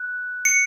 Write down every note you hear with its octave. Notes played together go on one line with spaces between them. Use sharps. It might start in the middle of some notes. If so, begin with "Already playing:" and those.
Already playing: F#6
C#7